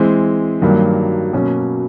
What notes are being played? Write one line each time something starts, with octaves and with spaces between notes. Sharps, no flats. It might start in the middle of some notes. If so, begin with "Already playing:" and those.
Already playing: E3 G#3 C4
G2 D#3 F#3 A#3
B2 F#3 A#3 C#4